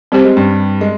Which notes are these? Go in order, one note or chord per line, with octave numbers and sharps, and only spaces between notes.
G3 C4 G4 C5
G#3
G2 G3
G#3